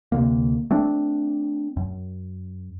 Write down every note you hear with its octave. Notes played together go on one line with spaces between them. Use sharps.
D2 C3 G3 A#3
A3 C4 D4
F#2